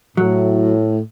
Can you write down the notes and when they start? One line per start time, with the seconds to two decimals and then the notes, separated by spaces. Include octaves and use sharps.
0.17 A2 F#3